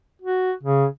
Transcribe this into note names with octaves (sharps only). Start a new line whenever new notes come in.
F#4
C#3